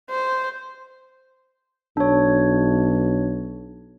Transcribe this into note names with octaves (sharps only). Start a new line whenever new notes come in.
C5
B1 D4 C#5